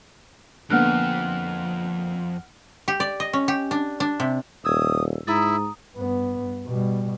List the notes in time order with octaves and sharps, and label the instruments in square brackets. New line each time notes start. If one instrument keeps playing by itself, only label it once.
[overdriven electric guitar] F2 [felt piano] D3 A#3 B3 [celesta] F#5 F6 F#6
[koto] G4
D5
D#5
C#4
G4
D4
D4
C3
[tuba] D#1 [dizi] D#6 [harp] E6 G#6
[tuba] G#2 [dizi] E4 [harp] A#5 D#6 A6
[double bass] G2 B3
B2 G3